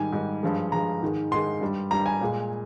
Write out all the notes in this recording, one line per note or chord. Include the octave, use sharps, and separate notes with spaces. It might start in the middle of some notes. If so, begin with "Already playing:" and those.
Already playing: G#2 D#3 G3 G#5
G#2 D#3 G3
G2 F3 G#3
G2 F3 G#3 A#5
G#2 D#3 G#3
G#2 D#3 G#3 C6
G2 G3
G2 G3 A#5
G#5
A#2 G#3